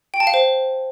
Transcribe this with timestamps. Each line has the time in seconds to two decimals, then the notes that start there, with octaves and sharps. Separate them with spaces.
0.14 G5
0.20 A5
0.27 F5
0.34 C5